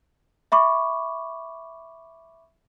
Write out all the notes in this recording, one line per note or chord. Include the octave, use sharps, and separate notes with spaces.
E5 B5 C#6 D6